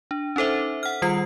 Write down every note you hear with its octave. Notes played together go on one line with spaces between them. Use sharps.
D4
C#4 D#4 A4 C5 E5
F#5 F6
D#3 G3 F4 C7